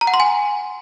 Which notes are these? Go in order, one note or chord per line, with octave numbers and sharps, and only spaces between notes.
A#5
F#5
C6
G#5